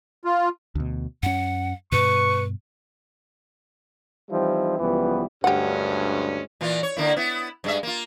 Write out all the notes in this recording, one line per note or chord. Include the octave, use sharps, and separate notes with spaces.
F4
D2 B2
F#2 C#4 F#5
G2 B2 B4 C#6
E3 F3 G3 C4 D#4 E4
C#2 E3 F3 G3 B3
D2 G2 G#3 C#4 G4 F#5
A#2 E3 F4
C#5
D3 A#3 E4
B3 E4
G2 G#3 E5
A#3 F4